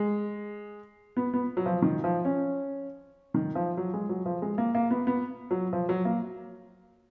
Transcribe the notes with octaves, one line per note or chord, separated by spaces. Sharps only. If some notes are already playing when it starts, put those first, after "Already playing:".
Already playing: G#3
B3
B3
F#3
F3
D#3
F3
C#4
D#3
F3
F#3
G#3
F#3
F3
G#3
A#3
A#3
B3
B3
F#3
F3
F#3
A#3